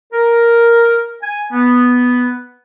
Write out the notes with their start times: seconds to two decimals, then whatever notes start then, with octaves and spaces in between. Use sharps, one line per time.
0.13 A#4
1.23 G#5
1.53 B3